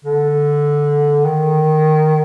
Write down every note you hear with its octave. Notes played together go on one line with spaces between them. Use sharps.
D3
D#3